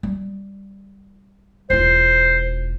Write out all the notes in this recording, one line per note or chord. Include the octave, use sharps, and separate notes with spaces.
G3
E1 F4 C5